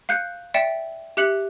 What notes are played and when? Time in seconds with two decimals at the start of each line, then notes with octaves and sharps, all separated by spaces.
0.09 F5 F#6 G6 C#7
0.54 D5 E5 G5 C#7 E7
1.17 G4 E5 F#6 C#7 F#7